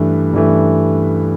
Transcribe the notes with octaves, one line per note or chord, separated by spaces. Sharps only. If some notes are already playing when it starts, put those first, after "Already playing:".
Already playing: G2 E3 A3
G2 E3 A3